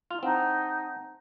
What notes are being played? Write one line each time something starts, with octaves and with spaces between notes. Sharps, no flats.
E4 F4 F7
C4 D#4 F#5 A5 A#5